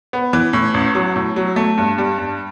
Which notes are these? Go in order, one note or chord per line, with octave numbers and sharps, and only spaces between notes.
B3
E3
A2
A1
F#3
A2
F#3
A3
G2
G3
G2